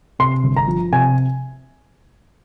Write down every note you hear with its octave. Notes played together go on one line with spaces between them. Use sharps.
C3 C6
G1
A#5
F3
C3 G#5